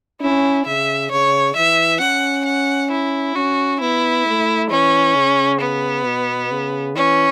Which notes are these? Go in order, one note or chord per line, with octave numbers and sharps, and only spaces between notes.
C#4 E4
C#3 E5
C#3 C#5
E3 E5
C#4 F#5
F#5
E4
C#4 F#4
B3 E4
A3
E3 C#4
C#3
B3
B2
C#3
E3 C#4